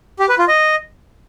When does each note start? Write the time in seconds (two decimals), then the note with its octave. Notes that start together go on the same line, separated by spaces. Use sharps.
0.19 G4
0.29 B4
0.38 F4
0.48 D#5